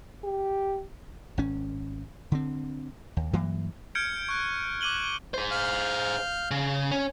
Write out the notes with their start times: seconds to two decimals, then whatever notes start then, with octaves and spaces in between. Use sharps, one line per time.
0.23 G4
1.38 G#1 C#4
2.32 D3 C4
3.17 D#2
3.33 G2 E3 F#3 A#3
3.95 F6 G6 G#6 C#7 D7
4.29 C#6 F#6
4.81 D6 F#6 D#7 F#7 G7
5.34 G#4 C5
5.51 F5 F6 G6
6.51 C#3
6.91 C#4